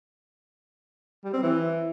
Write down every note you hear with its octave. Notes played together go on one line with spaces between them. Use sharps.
G3
C4
E3